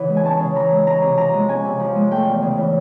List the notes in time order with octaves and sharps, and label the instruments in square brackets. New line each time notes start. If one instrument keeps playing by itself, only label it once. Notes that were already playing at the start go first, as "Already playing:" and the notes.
Already playing: [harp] C#3 E3 F#5
G#3
G#5
C#4 A5
C#3
E3 A#5
G#3
C#4 A#5
C3
F3 A#5
G#3
C#4 G#5
C3
F3
G#3
A3 G5
E2
C#3
E3